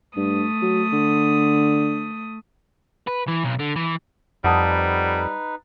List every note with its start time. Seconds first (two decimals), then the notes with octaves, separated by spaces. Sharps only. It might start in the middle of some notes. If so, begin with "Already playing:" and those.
0.17 G2 A3 D#6
0.62 F#3
0.92 D3
3.07 B4
3.27 E3
3.44 B1
3.59 D3
3.76 E3
4.44 F2 G3 D#4 B4 F#5 A5 D#6